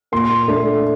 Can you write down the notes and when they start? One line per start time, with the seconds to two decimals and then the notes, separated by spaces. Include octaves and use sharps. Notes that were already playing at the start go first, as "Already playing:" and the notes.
0.12 A#2 C6
0.48 A3 D4